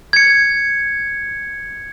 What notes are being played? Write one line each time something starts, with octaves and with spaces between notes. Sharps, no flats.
G#6 C#7